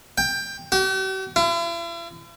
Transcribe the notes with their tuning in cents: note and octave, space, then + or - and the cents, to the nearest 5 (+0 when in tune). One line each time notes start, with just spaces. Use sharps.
G5 +15
G4 -45
E4 +45